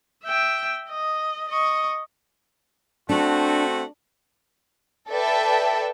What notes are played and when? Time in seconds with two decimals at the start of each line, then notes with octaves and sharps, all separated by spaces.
0.24 E5 G5
0.90 D#5
1.48 D#5 C#6
3.09 A3 C4 D4 F#4
5.11 A4 B4 D5 E5 G5 A5